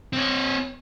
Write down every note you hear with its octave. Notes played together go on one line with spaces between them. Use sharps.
C4 C#5